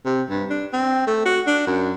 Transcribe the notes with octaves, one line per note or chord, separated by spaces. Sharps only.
C3
G2
D4
C4
A3
F#4
D4
F#2